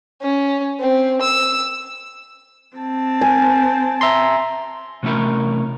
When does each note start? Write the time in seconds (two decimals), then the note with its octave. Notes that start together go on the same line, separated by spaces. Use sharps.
0.22 C#4
0.80 C4
1.21 E6
2.77 C4 A5
3.21 G#5
4.01 E5 A#5 C6
5.03 C3 A3 C#4 E4 A#4